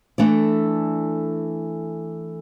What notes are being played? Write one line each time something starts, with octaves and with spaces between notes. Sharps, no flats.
E3 A3 D4 A4 D5